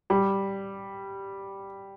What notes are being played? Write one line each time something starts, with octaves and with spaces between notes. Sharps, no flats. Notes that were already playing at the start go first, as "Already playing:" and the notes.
G3